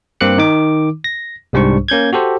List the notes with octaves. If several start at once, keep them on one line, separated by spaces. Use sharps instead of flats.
G2 A#3 C4 D6 F#6 C#7
D#3 D#4 D6
A#6
C2 G#2 G3 D4 C5 C#6
A#3 C#4 G6 G#6
F#4 G4 A4 C5